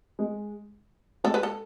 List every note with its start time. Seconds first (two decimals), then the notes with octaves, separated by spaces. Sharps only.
0.19 G#3
1.24 G#3 A4
1.34 B4
1.43 A4